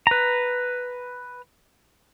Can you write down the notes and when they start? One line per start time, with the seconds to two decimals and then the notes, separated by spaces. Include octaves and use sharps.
0.07 B4 A#5